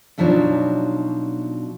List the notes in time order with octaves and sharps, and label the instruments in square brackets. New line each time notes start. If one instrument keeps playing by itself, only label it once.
[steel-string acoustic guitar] F#2 B2 F3 F#3 D4 D#4